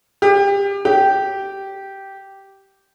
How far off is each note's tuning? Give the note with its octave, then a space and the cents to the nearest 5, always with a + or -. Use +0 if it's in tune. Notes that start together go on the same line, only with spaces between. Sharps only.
G4 +30
G4 -10